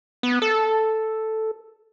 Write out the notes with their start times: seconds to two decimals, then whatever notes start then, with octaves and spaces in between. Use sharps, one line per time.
0.23 B3
0.42 A4